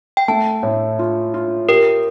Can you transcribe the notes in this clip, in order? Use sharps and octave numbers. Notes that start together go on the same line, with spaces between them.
G5
A3 A5
A2
F4
F4
G4 A#4